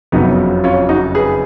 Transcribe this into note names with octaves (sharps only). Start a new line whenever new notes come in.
F#1 F2 C#3 F#3 B3 D#4
C#4 F4
D#4 F#4
G#4 B4